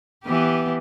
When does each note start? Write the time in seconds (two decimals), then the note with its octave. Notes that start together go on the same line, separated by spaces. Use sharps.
0.25 E3 B3 G4